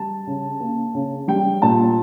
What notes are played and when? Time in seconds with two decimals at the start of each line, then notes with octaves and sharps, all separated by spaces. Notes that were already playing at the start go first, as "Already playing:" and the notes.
Already playing: G3 A5
0.27 C#3
0.60 A#3
0.95 C#3
1.28 G3 G5
1.62 A#2 A5